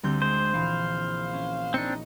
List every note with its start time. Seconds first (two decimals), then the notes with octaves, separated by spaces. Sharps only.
0.03 D2 G3 C4 G6
0.22 G#3 C5
0.54 A#1 E3 F5
1.33 C#4
1.74 C4 D4 D#4 D#6 C#7